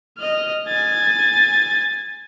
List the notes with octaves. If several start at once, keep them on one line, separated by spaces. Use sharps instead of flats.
D#5 F6
G#5 A6